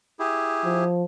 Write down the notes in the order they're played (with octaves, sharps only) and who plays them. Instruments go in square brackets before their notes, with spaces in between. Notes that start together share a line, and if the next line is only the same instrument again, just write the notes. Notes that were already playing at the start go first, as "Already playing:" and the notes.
[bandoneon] E4 G4 G#4
[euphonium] F3